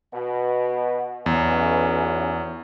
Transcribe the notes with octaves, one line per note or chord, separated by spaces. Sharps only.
B2
B1 E2 C#4